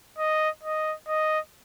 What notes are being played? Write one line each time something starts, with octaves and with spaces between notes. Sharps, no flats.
D#5
D#5
D#5